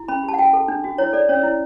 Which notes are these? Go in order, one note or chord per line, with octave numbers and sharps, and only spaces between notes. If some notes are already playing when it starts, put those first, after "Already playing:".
Already playing: E4
C#4 B5
B5
G4
A5
F#5
F#4 G5
A4
D4
F#4
E4 C#5
A4 D5
C#4 C#5
E4